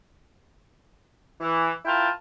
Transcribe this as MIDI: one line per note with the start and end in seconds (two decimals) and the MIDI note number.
1.40 1.71 52
1.85 2.08 64
1.85 2.08 65
1.85 2.08 70
1.85 2.08 79
1.85 2.08 81